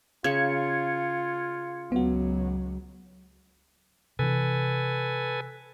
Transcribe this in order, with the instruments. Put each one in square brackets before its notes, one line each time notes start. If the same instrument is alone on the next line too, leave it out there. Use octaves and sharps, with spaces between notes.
[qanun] C#3 [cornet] F4 [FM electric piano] G#6 C#7
[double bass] C#2 F#3 [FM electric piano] B3 F#4
[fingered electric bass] C3 E3 [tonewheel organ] A4 B4 G#5